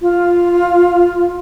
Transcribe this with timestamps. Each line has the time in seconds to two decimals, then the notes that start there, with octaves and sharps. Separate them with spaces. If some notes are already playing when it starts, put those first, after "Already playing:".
0.01 F4